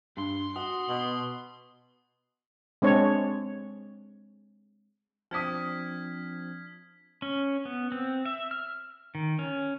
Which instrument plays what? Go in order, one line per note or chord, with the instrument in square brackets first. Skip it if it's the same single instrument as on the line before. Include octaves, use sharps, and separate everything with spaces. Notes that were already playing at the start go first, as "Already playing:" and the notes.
[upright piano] G2 [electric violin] C6
[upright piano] F#4 [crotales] D#6
[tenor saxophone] B2 [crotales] D#6 F#7
[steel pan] G#3 C4 D4 C#5
[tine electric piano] F3 C4 D4 [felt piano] A5 D#6 [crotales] F6 G#6 B6
[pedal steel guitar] C#4
B3
C4
E5
F6
D#3
C#4